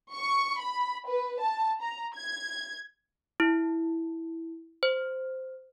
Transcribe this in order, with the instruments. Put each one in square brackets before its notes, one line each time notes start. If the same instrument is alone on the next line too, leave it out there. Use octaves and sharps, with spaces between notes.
[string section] C#6
B5
B4
A5
A#5
G#6
[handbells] E4
C5